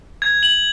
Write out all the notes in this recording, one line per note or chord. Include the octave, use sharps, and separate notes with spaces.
G#6
F#7